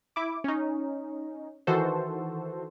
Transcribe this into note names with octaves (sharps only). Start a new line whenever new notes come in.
E4 D6
C#4 D#4
D#3 E3 F#4 A4 C5